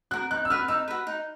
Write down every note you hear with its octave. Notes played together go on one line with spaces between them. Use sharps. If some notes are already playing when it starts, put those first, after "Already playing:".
F#4 A#4 F#6
D#4 F#6
E6
F#4 B4 F6
D#4 E6
F#4 B4
D#4